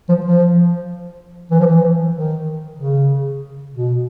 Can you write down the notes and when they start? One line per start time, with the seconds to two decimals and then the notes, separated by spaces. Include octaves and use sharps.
0.09 F3
0.25 F3
1.51 E3
1.60 F3
1.67 E3
2.15 D#3
2.78 C#3
3.74 B2